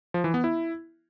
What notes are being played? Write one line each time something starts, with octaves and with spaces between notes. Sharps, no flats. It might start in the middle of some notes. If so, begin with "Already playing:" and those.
F3
E3
B3
E4